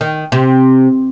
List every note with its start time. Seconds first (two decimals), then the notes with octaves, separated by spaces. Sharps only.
0.01 D#3
0.32 C3